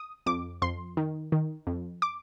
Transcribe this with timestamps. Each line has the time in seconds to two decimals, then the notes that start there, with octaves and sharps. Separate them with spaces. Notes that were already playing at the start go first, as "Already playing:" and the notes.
Already playing: D#6
0.26 F2 D6
0.62 F2 C6
0.97 D#3
1.32 D#3
1.67 F2
2.02 D6